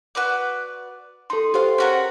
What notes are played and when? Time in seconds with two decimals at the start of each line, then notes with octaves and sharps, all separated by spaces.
0.15 F#4 B4 D5
1.30 D#4 A4 C6
1.54 F4 G4 C5 F5 C6
1.78 C#4 F#4 A#4